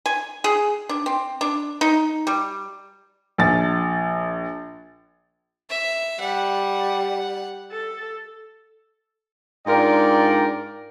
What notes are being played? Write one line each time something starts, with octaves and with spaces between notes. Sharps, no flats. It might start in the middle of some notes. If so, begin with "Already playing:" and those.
G#5
G#4
D4
C4
D4
D#4
G3
A#1 A6
E5
G3 F#5
A4
G#2 D4 F4 A#4 D5 G5